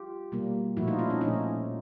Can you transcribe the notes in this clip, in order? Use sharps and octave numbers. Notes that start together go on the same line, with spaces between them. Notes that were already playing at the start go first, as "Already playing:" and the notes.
Already playing: F4 G4
B2 G3 A#3
A#2 F3 A3 E4 F#4
D#4 F4
D4 E4
C#4 D#4
A#2 F3 A3 C#4 D#4